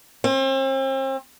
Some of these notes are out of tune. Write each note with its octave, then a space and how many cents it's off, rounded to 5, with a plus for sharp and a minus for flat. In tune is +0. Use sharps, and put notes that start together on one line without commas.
C4 +40